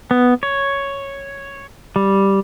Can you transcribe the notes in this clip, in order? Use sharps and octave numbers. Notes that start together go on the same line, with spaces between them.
B3
C#5
G3